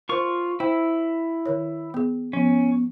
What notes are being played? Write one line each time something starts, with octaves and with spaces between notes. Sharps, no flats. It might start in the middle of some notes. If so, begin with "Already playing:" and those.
F4 A#4 C5 C#6
E4 C5 G5
D#3 A#4 C#5
B3 G#4
F3 B3 C#4